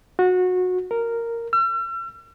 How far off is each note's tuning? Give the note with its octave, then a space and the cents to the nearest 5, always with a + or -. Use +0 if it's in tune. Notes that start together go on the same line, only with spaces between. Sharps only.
F#4 -20
A#4 -10
E6 +45